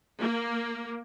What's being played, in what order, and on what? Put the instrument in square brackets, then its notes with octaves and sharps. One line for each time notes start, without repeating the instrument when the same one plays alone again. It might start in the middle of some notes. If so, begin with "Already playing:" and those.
[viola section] A#3